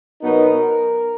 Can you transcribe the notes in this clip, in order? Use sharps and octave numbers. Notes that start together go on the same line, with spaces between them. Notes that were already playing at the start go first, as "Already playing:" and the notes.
B2 F#3 B3 D#4 A#4